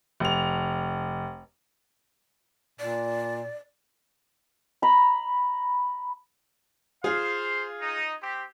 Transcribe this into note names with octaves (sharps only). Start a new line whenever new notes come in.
F1 F7
A#2 D5
A#5 B5
F4 G#4 C5 F5
D#4
C4 G4